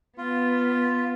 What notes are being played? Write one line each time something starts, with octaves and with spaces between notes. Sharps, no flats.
B3 F4